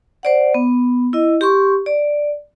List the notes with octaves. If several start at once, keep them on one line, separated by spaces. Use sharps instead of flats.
C5 D5 F#5
B3
E4 D#5
G4 C6 C#6
D5